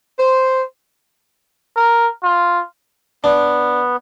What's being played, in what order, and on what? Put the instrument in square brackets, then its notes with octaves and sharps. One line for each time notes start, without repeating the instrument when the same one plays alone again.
[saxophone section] C5
[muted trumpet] A#4
F4
[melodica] B3 [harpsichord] D4